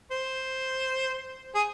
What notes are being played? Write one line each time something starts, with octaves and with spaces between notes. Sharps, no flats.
C5
G#4